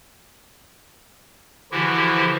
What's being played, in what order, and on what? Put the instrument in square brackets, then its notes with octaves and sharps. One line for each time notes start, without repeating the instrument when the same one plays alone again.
[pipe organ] D3 E3 F3 E4 F#4 G4